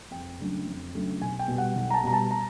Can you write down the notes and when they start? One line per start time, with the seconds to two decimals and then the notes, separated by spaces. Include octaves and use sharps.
0.11 F2 G5
0.39 C#3 F#3 A3 D4
0.66 F2
0.94 C#3 F#3 A3 D4
1.21 B1 G#5
1.39 G5
1.48 B2 G3
1.58 F#5
1.76 B1
1.90 A#5
1.94 A5
2.04 B2 G3 A#5
2.13 A5
2.31 A#5